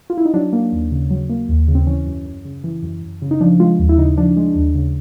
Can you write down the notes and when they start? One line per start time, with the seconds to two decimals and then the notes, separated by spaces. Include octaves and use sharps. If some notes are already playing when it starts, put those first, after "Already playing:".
0.10 F4
0.17 E4
0.25 D#4
0.34 F#3 D4
0.53 A#3
0.72 D#2
0.92 C#3
1.10 F#3
1.30 A#3
1.49 D#2
1.68 C#3
1.75 C4
1.87 E3 C#4
2.07 F#2
2.26 F#2
2.45 C#3
2.64 E3
2.83 F#2
3.02 F#2
3.22 C#3
3.31 D#4
3.41 F3 D4
3.60 G#3 F4
3.79 D#2
3.89 E4
3.98 C#3 D#4
4.17 F3 D4
4.37 G#3
4.55 D#2
4.75 C#3